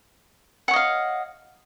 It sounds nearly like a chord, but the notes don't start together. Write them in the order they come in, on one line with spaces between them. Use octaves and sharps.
F#5 C#5 D#5 F5